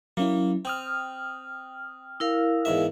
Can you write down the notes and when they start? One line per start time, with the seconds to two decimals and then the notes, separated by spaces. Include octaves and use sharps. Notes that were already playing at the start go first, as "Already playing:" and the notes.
0.17 F#3 A#3 C#4 E4
0.65 C4 G5 D#6 F6
2.20 E4 A#4 F5
2.65 E2 G#2 E5